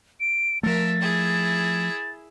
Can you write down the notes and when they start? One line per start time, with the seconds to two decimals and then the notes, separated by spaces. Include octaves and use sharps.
0.20 D7
0.63 F3 A3 A#4 E5 A6
1.01 E4 G#4